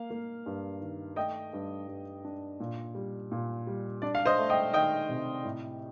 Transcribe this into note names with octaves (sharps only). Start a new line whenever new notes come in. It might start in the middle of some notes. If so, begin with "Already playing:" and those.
Already playing: A#3 F5
A#3
G2
D#3
A3 D#5 G5
G2
G2
D4
A#2
G3
A#2
G3
D4 D5
F5
C5 D#5
A3
D#5 G5
D#3 D#5 G5
C3
A2